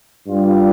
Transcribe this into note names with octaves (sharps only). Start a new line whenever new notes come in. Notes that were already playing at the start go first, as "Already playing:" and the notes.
G2 G3 F4